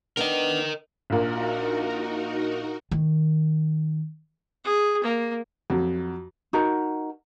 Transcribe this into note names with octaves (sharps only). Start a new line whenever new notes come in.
B3 D4 D#4 A#4 D#5
A#1 A#2 D#4 F#4 A#4
D#3
G#4
A#3
F2 F#3
D#4 F#4 A#4